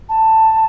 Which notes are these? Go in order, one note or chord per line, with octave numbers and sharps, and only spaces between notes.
A5